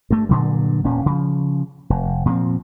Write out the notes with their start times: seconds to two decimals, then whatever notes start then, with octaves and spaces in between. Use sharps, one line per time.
0.10 G2 A3
0.29 G2 A#2 D3 F#3
0.84 E1 A#2 C#4
1.06 C#3 F3
1.90 F1
2.26 A#2 F3 C4